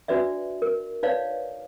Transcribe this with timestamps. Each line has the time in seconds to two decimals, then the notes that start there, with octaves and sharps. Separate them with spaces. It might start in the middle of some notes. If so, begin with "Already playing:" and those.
0.08 D4 F#4 B4 D5 E5
0.62 A#4
1.03 D#4 B4 C#5 D5 F5